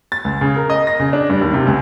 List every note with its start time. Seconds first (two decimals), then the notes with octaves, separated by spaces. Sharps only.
0.12 A6
0.25 C#2
0.41 C#3
0.56 A#4
0.70 D#5
0.87 A#6
1.00 C#3
1.13 D4
1.30 G2
1.41 D#2
1.54 C3
1.67 C#2